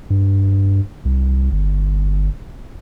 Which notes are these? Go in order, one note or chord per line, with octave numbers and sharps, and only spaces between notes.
G2
C2
G1